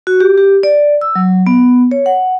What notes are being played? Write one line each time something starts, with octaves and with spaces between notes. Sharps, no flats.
F#4
G4
G4
D5
E6
F#3
B3
C#5
F#5